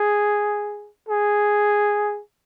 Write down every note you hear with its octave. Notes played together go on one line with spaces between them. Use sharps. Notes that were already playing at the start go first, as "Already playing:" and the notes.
Already playing: G#4
G#4